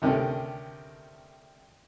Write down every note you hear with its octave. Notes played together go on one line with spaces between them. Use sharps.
D2 C3 D#3 C#4 A4